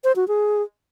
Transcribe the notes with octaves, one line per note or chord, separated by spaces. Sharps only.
C5
F#4
G#4